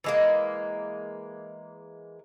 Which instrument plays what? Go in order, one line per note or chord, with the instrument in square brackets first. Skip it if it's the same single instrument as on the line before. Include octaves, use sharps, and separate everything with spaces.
[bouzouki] E3 G#3 A#3